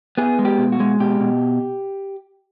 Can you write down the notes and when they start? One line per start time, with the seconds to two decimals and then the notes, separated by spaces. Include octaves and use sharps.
0.18 B3 G#4
0.39 G#3
0.45 G4
0.58 B2
0.72 F#4
0.80 G#3
1.00 B2 G4
1.20 B2